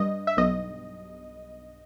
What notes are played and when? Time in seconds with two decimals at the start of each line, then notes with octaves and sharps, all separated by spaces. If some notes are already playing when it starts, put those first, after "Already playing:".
Already playing: G2 D#5
0.27 E5
0.37 B1 D#5